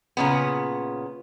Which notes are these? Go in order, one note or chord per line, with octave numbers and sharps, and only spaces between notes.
A#2 C#3 B3